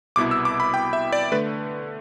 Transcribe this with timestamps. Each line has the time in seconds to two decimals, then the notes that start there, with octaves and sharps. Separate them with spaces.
0.16 C2 B2 B3 E4 D6
0.31 E6
0.45 D6
0.60 B5
0.74 G5
0.93 E5
1.13 D5
1.32 D3 A3 B4